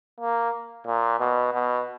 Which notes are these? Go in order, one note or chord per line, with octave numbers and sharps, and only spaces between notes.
A#3
A#2
B2
B2